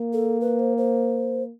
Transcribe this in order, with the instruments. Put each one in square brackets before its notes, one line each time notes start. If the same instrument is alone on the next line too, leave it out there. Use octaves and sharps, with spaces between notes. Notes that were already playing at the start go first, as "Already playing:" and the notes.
Already playing: [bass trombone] A#3
[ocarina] A4
B4
C5
C5